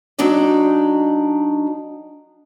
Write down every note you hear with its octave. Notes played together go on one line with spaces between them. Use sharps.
F#3 D4 D#4 D5